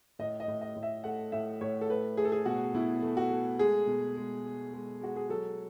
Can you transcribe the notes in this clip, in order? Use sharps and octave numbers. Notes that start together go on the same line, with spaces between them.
A2 D#5
D#5
A2
D#5
A2
E5
A3 F#5
A2 E5
A2 C#5
A4
A3 B4
A3 G#4
A4
G#4
B2 F#4
B2 E4
A3
F#4
A3
G#3 G#4
B2
G#3
G#3
G#3
G#3 F#4
G#4
F#3 A4